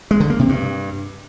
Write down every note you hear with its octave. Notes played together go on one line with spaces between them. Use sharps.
G#3
D3
A#3
C3
G2